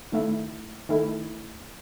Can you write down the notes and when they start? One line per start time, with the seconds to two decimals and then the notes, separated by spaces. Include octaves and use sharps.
0.12 D#3 A3 E4
0.89 D#3 A3 E4